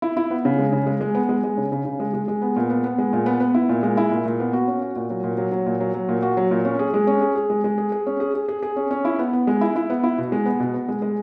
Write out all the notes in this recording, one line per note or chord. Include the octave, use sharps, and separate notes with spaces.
E4
E4
B3
C#3
G#3
C#3
G#3
G#3
B3
G#3
G#3
C#3
C#3
C#3
G#3
G#3
G#3
B3
A#2
B3
B3
G#3
A#2
B3
B3
E4
A#2
G#3
E4
A#2
A#2
B3
F#4
C#4
F#4
A#2
F#3
A#2
F#3
F#3
A#2
F#3
F#3
A#2
F#4
F#3
A#2
C#4
G#4
G#3
C#4
G#4
G#4
G#3
G#3
G#4
G#4
C#4
G#4
G#4
G#4
G#4
C#4
C#4
E4
B3
B3
G#3
E4
E4
B3
E4
B2
G#3
B3
B2
B3
G#3
G#3